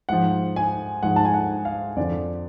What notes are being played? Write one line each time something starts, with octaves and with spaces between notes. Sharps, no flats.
G#2 F3 F#5
G#5
G#2 F3 F#5
A5
G#5
F#5
F5
F2 D3 F3 D5